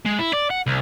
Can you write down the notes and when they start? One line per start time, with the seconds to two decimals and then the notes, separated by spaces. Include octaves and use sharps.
0.06 G#3
0.19 E4
0.34 D5
0.50 F#5
0.67 C2